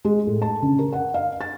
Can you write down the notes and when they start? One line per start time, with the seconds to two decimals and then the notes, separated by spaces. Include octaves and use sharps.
0.05 G#3
0.27 A2
0.42 A5
0.62 C#3
0.79 A#4
0.93 F#5
1.14 F5
1.41 A6